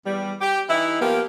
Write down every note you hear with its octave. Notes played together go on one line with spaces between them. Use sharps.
E2 G3
G4
E3 D#4 E4
F3 A#3 B3 G4